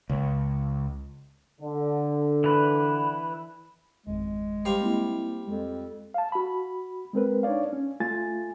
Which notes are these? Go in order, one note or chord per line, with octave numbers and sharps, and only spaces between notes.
C#2
D3
E3 B4
G#1 F2 G#3
G3 C5 F5
A#3 C4 E4
F2 G#3
F5 A5
F#4 B5
G#3 C4 A#4 B4
D4 D#4 C#5 D5 F5
C#4
A3 F4 G#5 A6